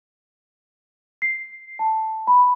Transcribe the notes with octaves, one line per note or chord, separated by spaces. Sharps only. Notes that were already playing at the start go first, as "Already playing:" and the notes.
C7
A5
B5